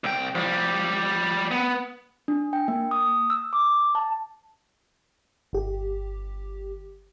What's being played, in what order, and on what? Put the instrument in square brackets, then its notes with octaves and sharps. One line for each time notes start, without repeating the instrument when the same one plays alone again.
[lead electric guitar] C2 G5
F3 G3
B3
[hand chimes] D4
G5
A#3
D#6
E6
D6
A5
[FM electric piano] G1 G4